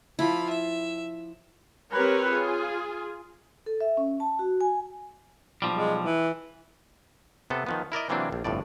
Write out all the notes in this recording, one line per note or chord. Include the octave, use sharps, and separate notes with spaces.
F3 E4 F4 B5
E5
C4 G4 A#4 B4 C#5
F4 G#4
A4
E5
C#4
A5
F#4
G#5
B1 F3 G3
G#3
E3
C3 B3 A4
D#3 F3 B3
E4 A#4 D5 D#5
C3 E3 F#3 A#3 C4 D4
A#1
G1 F2 A2 D5